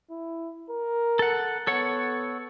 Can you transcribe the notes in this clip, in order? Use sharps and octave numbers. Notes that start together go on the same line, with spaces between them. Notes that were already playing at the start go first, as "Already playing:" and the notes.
E4
A#4
A4 F#5
B3 A4 C#5 F#5